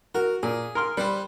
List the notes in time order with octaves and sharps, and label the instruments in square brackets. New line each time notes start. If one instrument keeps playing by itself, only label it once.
[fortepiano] F#4 [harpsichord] A#4
[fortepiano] A#2 [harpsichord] G#4
[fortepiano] A#4 C6 F6
[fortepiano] G3 [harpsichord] B4 C5